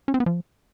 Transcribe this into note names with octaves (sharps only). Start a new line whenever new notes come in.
C#4
C4
B3
F3